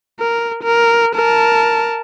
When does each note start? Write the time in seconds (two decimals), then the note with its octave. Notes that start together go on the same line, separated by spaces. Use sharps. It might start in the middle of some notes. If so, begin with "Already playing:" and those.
0.20 A#4
0.63 A#4
1.15 A#4 A5